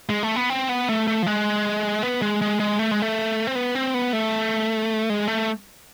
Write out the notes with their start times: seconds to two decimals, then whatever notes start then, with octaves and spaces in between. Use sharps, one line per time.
0.09 G#3
0.23 A3
0.36 B3
0.50 C4
0.69 B3
0.89 A3
1.07 A3
1.23 F3
1.26 G#3
2.03 B3
2.22 G#3
2.42 G#3
2.60 G#3
2.79 A3
2.91 G#3
3.02 A3
3.47 C4
3.55 B3
3.75 C4
3.94 B3
4.13 A3
5.10 G#3
5.28 A3